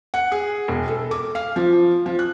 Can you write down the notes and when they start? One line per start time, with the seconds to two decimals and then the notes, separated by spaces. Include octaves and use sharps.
0.14 F#5
0.32 G#4
0.68 E1
0.88 A4
1.11 D6
1.35 F5
1.56 F3
2.06 F3
2.19 F#6